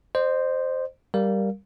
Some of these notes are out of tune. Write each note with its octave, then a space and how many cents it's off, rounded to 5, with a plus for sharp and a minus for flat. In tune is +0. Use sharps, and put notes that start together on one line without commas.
C5 +0 D#5 -40
G3 +0 A#4 +0 F5 +0